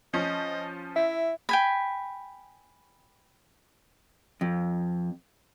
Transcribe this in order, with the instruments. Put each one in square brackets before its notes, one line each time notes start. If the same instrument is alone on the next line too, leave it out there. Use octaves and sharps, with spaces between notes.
[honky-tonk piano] F3 C#4 [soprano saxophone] D#5
[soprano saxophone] E4 [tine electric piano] E5
[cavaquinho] G5 G#5 B5
[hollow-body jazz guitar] F2